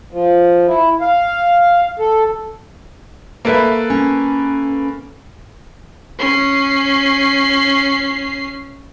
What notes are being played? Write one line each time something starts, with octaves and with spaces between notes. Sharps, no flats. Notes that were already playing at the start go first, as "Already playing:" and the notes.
F3
E4
F5
A4
A#3 A4 B4 C#5 E5
C#4
C#4 C7